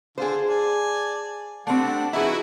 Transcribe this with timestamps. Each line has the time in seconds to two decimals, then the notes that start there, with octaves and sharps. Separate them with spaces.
0.18 D3 F4 G#4 C5
0.47 D5 G#5 A5
1.67 G3 A3 C4 D4 F#5
2.13 F3 D#4 E4 F#4 G#4 B4